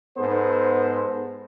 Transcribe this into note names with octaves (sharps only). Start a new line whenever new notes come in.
G#2 B3 A4 C5